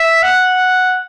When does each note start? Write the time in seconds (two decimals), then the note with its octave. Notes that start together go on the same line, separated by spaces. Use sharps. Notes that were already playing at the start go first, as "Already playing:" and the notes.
Already playing: E5
0.23 F#5